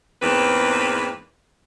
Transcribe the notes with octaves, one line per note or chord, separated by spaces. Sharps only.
E2 G#2 A#3 C4 B4